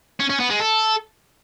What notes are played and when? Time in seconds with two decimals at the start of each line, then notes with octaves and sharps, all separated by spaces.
0.20 C#4
0.30 C#4
0.40 B3
0.50 G#3
0.60 A4